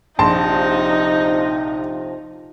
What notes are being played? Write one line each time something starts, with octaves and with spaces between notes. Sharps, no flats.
A#1 C3 F3 D#4 A5 C6